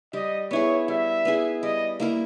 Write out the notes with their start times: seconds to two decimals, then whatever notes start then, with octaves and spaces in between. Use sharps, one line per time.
0.13 G3 D#5
0.51 B3 E4 G#4 C#5
0.88 G3 E5
1.25 B3 E4 G#4
1.62 G3 D#5
2.00 A#3 E4 A#4